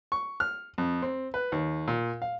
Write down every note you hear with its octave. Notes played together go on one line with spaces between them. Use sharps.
C#6
F6
F2
C4
B4
D#2
A#2
F5